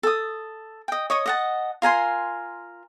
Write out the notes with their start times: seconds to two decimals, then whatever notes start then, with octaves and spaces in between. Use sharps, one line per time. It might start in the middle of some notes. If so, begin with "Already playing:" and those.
0.03 A4 D#6
0.88 D#5 G5
1.10 C#5 D#5 C#6 D#6
1.26 D#5 F#5 A5
1.82 F4 A#4 G#5 C6